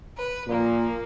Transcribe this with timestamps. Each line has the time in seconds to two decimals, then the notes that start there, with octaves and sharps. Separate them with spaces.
0.17 B4
0.48 A#2 F3 A#3